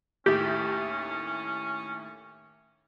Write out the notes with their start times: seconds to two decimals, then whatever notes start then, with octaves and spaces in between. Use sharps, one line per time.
0.26 D#2 A2 C#4 G4 E5